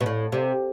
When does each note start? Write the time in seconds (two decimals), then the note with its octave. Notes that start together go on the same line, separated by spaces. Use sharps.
0.01 B2
0.06 A2
0.32 C3